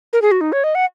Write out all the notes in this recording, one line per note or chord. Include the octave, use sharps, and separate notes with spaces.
A#4
G#4
F#4
D#4
C#5
D#5
F#5